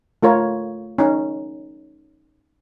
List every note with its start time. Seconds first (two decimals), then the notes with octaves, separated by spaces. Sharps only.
0.23 A3 F4 A#4 C#5
0.98 C#4 D#4